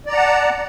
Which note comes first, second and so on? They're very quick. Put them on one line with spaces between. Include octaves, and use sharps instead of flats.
D5 A#5 F#5 A5